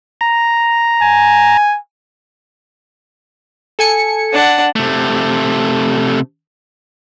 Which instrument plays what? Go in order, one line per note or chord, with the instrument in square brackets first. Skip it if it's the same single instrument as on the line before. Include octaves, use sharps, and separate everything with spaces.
[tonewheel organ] A#5
[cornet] G#5
[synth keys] A4 G#5 C#7
[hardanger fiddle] D4 F#5
[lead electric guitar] C3 A3